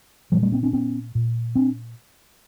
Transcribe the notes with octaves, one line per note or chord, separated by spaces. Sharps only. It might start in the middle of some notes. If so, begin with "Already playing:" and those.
A#2 F3 G3
G3 A3
B3 C#4
C4 D4
B3 C#4
A#2
C4 D4